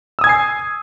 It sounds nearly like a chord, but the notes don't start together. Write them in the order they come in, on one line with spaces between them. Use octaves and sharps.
E6 D#6 G#6 G#5 C7